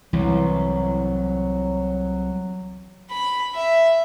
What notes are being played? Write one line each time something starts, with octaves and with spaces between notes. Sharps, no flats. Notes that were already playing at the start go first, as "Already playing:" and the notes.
C2 E3 F#3
B5
E5